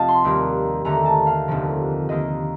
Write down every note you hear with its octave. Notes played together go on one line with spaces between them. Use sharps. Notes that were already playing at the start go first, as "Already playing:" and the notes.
Already playing: F1 D#5 F5 A5
C6
D#2 D#3 G3 A#3
D#2 D3 A3 A#5
A5
F5
F1 D#2 D3 F3 A#3
D#2 D#3 A#3 D#5